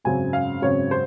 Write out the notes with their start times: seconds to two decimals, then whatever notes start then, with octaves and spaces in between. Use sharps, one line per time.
0.04 G#1 F#2 C#3 F#3 C4 G#5
0.33 F5
0.62 G#1 F#2 C#3 F#3 C4 C#5
0.91 C5